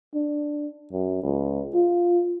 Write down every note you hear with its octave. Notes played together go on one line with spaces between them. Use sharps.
D4
F#2
C#2
F4